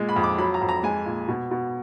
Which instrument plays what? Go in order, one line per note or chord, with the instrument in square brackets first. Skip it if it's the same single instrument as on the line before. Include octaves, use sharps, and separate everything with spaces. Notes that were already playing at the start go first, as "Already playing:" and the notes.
Already playing: [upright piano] A#2 G#3
B5
F2
D6
F#3 B5
A#5
F2
A#5
G#3 G#5
A#2
B2
B2